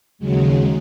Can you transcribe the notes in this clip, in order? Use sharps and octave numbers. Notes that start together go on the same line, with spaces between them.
D#2 C#3 F#3 G#3